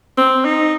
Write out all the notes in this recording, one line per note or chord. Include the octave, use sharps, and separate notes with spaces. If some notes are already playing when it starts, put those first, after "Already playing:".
C4
D#4